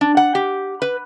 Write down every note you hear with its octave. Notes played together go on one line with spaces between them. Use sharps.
D4
F#5
G4
B4